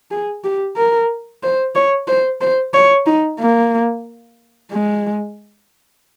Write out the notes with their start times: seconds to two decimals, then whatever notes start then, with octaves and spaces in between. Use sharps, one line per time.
0.11 G#4
0.44 G4
0.77 A#4
1.43 C5
1.75 C#5
2.07 C5
2.41 C5
2.74 C#5
3.06 D#4
3.39 A#3
4.71 G#3